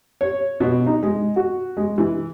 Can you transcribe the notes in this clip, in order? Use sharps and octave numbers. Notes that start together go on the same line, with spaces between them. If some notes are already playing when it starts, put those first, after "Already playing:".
C#5
B2
D#4
G#3
F#4
G#3
E3